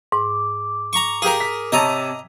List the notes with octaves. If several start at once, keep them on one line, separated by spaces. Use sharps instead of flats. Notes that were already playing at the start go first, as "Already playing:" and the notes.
G#2 D6
A#5 C#6
G4 G#4 A#4 F5
B6
C3 C#5 D#5 A5 A#5